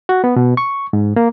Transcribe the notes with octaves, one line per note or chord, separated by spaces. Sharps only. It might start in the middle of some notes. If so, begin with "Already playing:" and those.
F#4
B3
B2
C#6
G#2
A#3